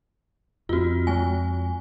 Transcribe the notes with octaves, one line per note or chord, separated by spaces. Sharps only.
F2 C4 F4 F#4
G#3 G#5